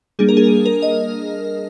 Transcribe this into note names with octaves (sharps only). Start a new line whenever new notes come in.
G3 A#3 D4 G#4
A#4
G#4
A#4
D#5